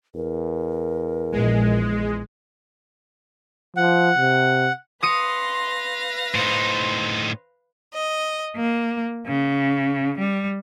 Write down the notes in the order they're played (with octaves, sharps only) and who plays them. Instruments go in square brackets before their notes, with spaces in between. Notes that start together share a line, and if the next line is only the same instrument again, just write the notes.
[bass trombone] E2 [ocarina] A#4
[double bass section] A#1 [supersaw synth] G#3
[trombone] F3 [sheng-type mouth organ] F#5
[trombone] C3
[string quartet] B4 F5 A#6 [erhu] C6 [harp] D#6 C#7 D#7
[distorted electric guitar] A2 D#4 [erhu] C5
[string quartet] D#5
A#3
C#3
G3